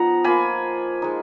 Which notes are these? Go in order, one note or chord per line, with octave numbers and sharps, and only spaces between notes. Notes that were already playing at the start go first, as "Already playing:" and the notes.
Already playing: F3 B3 D#4 F#5 A#5
A#3 F4 G#5 B5
G#3 D#4